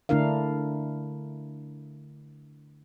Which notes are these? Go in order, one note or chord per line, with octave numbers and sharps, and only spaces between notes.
D3 A3 D4 E4 A#4 F5